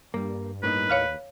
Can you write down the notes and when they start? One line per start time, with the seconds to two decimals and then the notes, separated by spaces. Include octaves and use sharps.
0.14 G2 G3 A#3
0.63 A2 A#3 D#4 B4
0.90 D#2 C#5 F5 F6